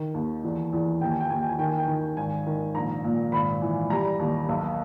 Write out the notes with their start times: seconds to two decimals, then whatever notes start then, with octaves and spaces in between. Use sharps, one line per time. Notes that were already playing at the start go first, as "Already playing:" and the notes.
Already playing: D#3
0.14 D#2
0.44 E2
0.73 E2
1.01 D#2 G5
1.11 G#5
1.20 G5
1.30 D#2 G#5
1.40 G5
1.49 G#5
1.59 D#3 G5
1.69 G#5
1.78 G5
1.88 D#3
2.17 G#1 G#5
2.47 D#3
2.75 A#1 A#5
3.04 A#2
3.32 G#1 B5
3.62 E3
3.90 G3 A#5
4.19 D#2
4.49 B1